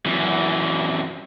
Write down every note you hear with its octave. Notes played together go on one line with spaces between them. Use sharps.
F#2 E3